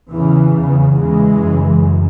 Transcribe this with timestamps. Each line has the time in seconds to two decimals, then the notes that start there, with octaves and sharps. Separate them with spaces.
0.11 E2 C#3 E3
0.53 E2 C#3
0.94 E2 C#3 E3 G#3
1.36 F#2 C#3
1.78 F#2